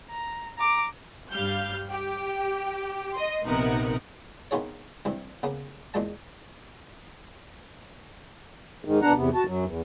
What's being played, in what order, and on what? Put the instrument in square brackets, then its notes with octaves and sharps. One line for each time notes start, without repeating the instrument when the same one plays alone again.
[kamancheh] A#5
A#5 D6
[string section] G2 G3 F5 F6 G6
G4
D#5 C6
A#1 C3 B3 D#4 A#4 F#5
[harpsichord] D#3 B3 F4 G#4 C#5
G2 C3 E3
C#3 A#3 B3
E2 A#2 G#3 A5
[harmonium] G#2 D#3
B2 D4 F#5 A#5
E2 C3 B3
F#4 A5
F#2 F#3
E2